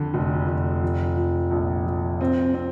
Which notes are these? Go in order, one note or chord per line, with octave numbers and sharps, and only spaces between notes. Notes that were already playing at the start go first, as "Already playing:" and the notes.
Already playing: F2 D3
F1
F1
F3
F3
A#1
F3
C4
C4